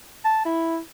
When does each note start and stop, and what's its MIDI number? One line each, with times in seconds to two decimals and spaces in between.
0.25 0.44 81
0.45 0.78 64